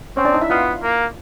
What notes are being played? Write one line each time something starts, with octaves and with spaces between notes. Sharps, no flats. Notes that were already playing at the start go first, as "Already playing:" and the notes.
C4 C#4 C#5
D4 D5
D#4 D#5
E4 E5
B3 F4 F5
A#3